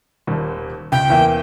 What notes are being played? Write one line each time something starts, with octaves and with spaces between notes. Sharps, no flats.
D#1 D#2 G3
C#2 G5
E2 A#3 E5